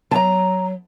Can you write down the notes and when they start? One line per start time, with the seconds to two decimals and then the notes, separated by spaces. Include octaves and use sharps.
0.11 F#3 A5 A#5